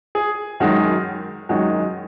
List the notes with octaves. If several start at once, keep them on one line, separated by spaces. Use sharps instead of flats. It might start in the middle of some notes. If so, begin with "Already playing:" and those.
G#4
F#2 D#3 G#3 F#4
F#2 D#3 G#3 F#4